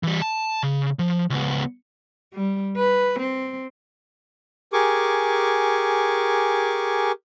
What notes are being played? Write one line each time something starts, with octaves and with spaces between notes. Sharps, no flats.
E3 G3
A5
C#3
F3
C#2 B3
G3
B4
C4
G4 G#4 A#4 G#5 C#6 D6